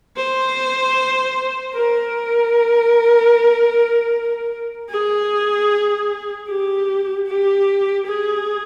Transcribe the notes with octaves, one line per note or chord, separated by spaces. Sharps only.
C5
A#4
G#4
G4
G4
G#4